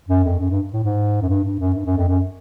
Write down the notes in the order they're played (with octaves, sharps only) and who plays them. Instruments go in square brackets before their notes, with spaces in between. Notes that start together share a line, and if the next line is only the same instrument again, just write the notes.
[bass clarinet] F#2
F2
F#2
G2
A2
G#2
F#2
G2
G2
F#2
G2
F#2
F2
F#2